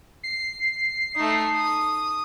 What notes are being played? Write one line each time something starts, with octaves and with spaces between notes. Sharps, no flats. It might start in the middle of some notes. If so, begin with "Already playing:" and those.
C7
A3 D#4
D#6